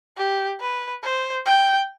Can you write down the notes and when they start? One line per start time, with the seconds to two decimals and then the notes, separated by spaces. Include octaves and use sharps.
0.17 G4
0.60 B4
1.03 C5
1.46 G5